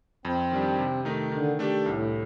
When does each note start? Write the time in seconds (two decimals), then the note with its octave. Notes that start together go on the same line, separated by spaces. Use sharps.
0.25 F2 C4
0.52 D#3 G3 D4
0.78 C3
1.05 D#3 A3 D#4
1.32 D3 D#3
1.59 A3 D4 G4
1.86 C2 A2